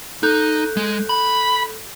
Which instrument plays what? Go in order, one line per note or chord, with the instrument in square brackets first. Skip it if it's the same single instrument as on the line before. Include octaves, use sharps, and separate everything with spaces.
[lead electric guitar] D#4 [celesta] A4 F#6 G6
[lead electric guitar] G#3
B5